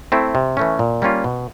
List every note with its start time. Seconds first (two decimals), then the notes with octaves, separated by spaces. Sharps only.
0.12 A3 C4 E4
0.35 C3
0.57 E3 A3 C#4
0.79 A#2
1.02 G3 A#3 C#4 F4
1.24 B2